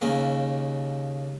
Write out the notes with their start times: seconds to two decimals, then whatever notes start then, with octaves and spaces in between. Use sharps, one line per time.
0.01 D#2 C#3 A#3